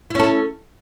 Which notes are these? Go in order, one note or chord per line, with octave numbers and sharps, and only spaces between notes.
C#4 E4 A4